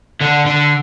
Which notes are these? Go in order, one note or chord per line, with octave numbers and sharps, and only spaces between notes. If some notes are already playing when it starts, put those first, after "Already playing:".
D3
D3